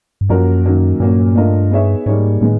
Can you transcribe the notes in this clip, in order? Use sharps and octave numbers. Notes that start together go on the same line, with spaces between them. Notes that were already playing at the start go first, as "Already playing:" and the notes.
G2
F#2 F3 A#3 C#4 F#4 A#4
D#3 F#3 A#3 C#4
G2 A#2 F#3 A#3 C#4
A3 D4 F4 A#4 D#5
B3 D#4 G#4 C#5 E5
G#2 G3 A#3 D#4 G#4 C#5
A2 D#3 G#3 B3